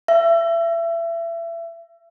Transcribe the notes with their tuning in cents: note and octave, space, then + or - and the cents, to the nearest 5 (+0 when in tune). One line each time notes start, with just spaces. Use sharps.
E5 +30